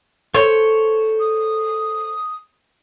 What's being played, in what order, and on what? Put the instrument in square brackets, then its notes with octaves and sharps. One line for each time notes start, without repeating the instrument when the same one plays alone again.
[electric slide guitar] A4 C5 [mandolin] C#5
[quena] D#6